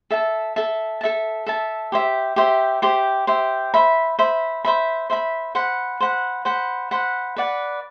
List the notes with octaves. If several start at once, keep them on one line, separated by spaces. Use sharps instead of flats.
A4 E5 A5
A4 E5 A5
A4 E5 A5
A4 E5 A5
G4 C5 E5
G4 C5 E5
G4 C5 E5
G4 C5 E5
C5 E5 B5
C5 E5 B5
C5 E5 B5
C5 E5 B5
C5 F#5 B5
C5 F#5 B5
C5 F#5 B5
C5 F#5 B5
B4 D5 F#5